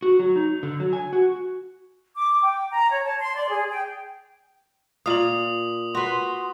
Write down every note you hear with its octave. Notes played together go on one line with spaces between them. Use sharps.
F#4
F#3
D#4
D3
F#3
G#5
F#4
D6
G5
A#5
C#5
A5
C6
D5
G#4
G5
A#2 F5 D#6 F#7
F#4 B4 C6